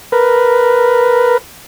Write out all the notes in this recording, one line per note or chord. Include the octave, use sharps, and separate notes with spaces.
A#4 B4